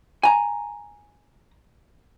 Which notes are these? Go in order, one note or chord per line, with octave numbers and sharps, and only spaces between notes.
G#5 A#5